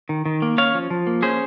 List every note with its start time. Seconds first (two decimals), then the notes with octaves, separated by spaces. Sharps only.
0.09 D#3
0.26 D#3
0.42 A#3
0.58 C#4 C#5 F5
0.75 F3
0.90 F3
1.07 A#3
1.22 C#4 G#4 C5